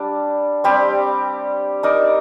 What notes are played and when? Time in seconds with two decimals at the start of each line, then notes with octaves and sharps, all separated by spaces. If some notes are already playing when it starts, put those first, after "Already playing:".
Already playing: G3 D4
0.64 G3 C4 G4
1.83 D#4 A#4 D5